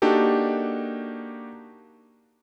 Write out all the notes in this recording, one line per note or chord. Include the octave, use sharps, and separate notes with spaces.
A#3 D4 D#4 F#4 G4 A4